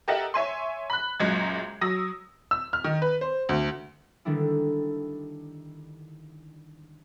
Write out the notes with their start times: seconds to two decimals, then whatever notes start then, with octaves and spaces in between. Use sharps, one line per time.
0.08 G4 A4 A#4 D#5 E5 F#5
0.34 C#5 E5 G#5 C6
0.90 B5 F#6
1.20 C#2 F#2 A#2 G#3 G#6
1.81 F#3 D#6 E6 A#6
2.51 E6
2.73 F6
2.84 D#3
3.02 B4
3.21 C5
3.49 D2
4.25 D3 D#3 G3 D4 E4